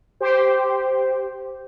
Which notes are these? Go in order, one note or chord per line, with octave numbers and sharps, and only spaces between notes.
G4 C5